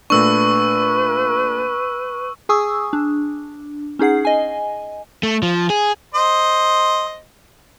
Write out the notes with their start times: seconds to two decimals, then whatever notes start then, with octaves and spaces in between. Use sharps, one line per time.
0.10 A#2 A3 D4 B4 C#6 E6
2.49 G#4 G#5 C#6 D#6 E6
2.93 D4
3.99 C#4 D#4 G#4 F#5 C7
4.25 D#5 G#5
5.23 A3
5.43 F3
5.70 G#4
6.14 C5 D#5